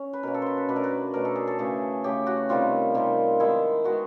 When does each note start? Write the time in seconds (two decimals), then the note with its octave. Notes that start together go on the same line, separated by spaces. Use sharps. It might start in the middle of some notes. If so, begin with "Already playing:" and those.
Already playing: C#4
0.13 B4
0.23 B2 F#3 A#3 C#4 A#4
0.34 A4
0.42 B4 C5
0.57 B4
0.68 B2 F#3 A3 D4 B4
0.76 A#4
0.84 B4
1.14 B2 F#3 A3 D4 A#4
1.25 A4
1.35 G#4
1.47 A4
1.59 C#3 E3 A3 G#4
2.04 C#3 E3 A3 G4
2.27 F#4
2.49 C3 D#3 G3 C4 F4
2.95 C3 D#3 G3 C4
3.40 D#3 G#3 B3 E4
3.84 D#3 G#3 B3 F#4